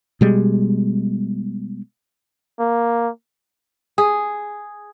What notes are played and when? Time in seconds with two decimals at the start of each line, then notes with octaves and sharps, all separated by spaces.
0.21 B2 G3 G#3
2.59 A#3
3.98 G#4